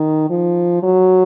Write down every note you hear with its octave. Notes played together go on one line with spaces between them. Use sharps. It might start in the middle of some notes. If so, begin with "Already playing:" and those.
Already playing: D#3
F3
F#3